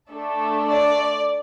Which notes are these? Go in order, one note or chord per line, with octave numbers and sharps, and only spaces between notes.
A3 D4 A4
D5